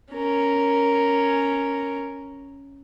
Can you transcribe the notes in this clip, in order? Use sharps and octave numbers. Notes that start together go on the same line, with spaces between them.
C#4 A#4